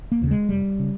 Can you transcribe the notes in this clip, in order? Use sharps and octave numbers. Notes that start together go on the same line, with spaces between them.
A#3
D#2 C#3
G#3
F1 G3
C#3